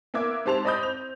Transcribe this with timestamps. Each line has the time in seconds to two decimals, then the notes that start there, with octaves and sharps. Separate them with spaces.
0.14 A#3 B3 E5 D6 G#6
0.45 G#2 C4 G4 A5 C6 F7
0.64 C5 D5 D#5 B5 D#6 G6
0.82 C4 F7